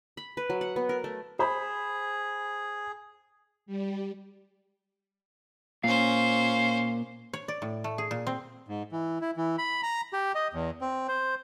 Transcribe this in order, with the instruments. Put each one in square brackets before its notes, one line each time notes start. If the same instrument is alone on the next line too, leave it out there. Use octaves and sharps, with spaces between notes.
[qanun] B5
B4
F#3
F#5
B3
A#4
A3
[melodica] G#4 [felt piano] C5 B5
[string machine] G3
[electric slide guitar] A#2 [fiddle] C#4 C5 [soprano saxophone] F5
[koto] C#5
D5
A2
A3
G#4
A#2
C4
[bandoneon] G#2
E3
E4
E3
B5
A#5
G4
D#5
E2
C4
C5